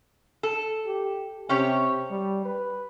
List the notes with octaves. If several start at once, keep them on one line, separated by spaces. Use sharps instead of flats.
A4
G4
C3 C#4 G4 C#5
G3
B4